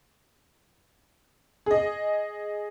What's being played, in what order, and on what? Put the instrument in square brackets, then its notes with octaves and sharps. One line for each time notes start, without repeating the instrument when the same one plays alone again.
[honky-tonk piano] G#4 D#5